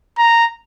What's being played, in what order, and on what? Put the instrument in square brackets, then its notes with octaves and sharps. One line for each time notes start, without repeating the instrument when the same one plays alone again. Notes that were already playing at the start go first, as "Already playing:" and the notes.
[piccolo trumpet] A#5